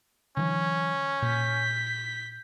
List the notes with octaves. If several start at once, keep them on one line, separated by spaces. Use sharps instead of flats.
D3 E3 F#3 C#4
A#2 G6 B6